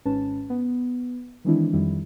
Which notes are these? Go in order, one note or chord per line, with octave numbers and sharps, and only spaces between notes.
G#1 G#2 C#4 B4 A5
B3
D#3 E3 G#3 C4 D4 E4
F2 D#3 G3 E4